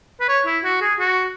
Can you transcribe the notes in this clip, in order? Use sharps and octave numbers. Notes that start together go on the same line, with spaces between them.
B4
C#5
E4
F#4
G#4
F#4